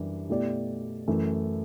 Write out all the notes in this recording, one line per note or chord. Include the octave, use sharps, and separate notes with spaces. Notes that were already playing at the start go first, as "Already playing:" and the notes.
Already playing: F#2 E3 G3 D4 G4
B2 A3 E4 G4 D5
F#2 E3 A3